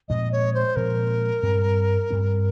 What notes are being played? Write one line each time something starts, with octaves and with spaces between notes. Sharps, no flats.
A#2 F3 G#3 C4 D#5
C#5
C5
A#2 F3 G#3 C4 A#4
G2 G3 C4
G2 G3 C4